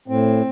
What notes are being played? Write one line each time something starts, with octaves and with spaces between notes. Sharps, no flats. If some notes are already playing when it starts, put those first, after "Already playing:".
A2 C4